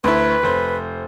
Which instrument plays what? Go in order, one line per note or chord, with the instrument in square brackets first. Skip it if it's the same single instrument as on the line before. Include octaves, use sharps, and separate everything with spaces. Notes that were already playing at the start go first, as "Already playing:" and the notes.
[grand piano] D2 E4 [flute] B4
[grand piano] F1 C5